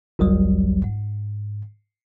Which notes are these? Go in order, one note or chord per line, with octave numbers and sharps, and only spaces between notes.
G1 C2 F2 F#3 G3
G#2